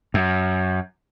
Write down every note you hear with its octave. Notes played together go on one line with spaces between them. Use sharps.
F#2